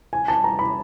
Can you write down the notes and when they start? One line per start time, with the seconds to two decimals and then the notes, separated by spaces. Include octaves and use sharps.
0.13 G#5
0.28 A5
0.44 A#5
0.59 B5